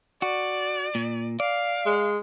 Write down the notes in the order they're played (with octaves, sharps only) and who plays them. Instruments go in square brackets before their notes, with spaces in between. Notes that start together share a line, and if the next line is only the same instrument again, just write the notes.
[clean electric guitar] F#4 [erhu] D5
[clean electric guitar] A#2
[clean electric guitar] D5 [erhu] F5
[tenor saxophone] G#3